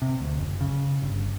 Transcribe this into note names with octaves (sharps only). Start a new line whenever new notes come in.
C3
D2
F#1
C#3
G1